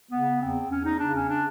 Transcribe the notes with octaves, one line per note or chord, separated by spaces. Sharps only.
C#3 B3
E2 C4
E2 C#4
D#4
C#3 D4
C#4
D4